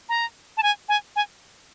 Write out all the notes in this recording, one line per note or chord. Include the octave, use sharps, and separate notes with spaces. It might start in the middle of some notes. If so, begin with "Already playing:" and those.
A#5
A5
G#5
G#5
G#5